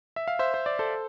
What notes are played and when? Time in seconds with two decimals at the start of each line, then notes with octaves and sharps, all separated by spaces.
0.16 E5
0.28 F5
0.39 C5 E5
0.54 C5
0.66 D5
0.79 A4 C5